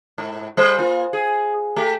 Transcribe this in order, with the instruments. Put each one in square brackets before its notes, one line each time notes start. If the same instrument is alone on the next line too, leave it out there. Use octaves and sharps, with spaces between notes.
[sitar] G#2
G3 C5
A#3 F4
G#4
A3 G4